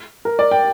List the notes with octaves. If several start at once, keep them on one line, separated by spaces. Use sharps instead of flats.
A#4
D5
G5